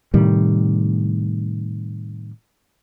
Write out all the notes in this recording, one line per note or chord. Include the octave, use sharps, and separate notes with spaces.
A2 C3 D#3 G3